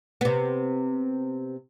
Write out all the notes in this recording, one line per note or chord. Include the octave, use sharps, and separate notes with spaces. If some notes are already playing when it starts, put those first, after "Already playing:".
C3 B3